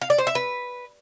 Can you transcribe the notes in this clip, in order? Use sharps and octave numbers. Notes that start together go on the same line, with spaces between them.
F5
D5
C5
E5
B4